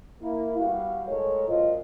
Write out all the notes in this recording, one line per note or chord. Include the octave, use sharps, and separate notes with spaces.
A#3 E4
G3 B3 F#4 F5
A2 G#3 A4 A#4 C#5
C#2 F#2 A#2 F4 C5 D#5